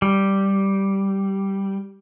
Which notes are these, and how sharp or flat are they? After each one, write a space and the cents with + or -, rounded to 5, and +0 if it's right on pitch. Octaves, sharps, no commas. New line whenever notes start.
G3 -5